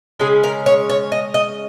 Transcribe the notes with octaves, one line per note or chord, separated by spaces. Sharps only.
C#3 G#3 C#4 G#4
A#4
C#5
C#5
D#5
D#5